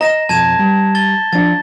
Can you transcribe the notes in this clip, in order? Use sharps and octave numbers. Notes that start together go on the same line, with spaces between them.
D#5 A#5 A#6 E7
B1 F2 A5 G#6 E7
G3
A6 G7
F3 D4 A6